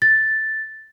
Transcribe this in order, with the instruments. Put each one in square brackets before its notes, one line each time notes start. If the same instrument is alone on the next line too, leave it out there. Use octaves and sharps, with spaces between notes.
[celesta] A6